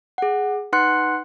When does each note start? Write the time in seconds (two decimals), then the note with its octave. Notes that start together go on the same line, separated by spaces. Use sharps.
0.18 G#4 F#5
0.73 D#4 B4 F#5 C6 F#6 C#7